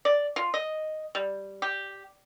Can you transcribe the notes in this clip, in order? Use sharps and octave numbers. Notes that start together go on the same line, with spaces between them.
D5
F4
D#5
G3
G4